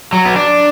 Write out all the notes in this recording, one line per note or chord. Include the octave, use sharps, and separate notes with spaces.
F#3
B3
D4